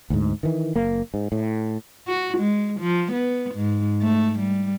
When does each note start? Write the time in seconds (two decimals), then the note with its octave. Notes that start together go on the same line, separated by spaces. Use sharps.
0.10 D2 G#2
0.43 D#3 E3
0.76 F#1 A#3
1.14 G#2
1.32 A2
2.08 F#4
2.38 G#3
2.80 F3
3.13 B3
3.55 G#2
4.02 A3
4.39 G3